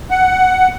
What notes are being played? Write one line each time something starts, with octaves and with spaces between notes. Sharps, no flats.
F#5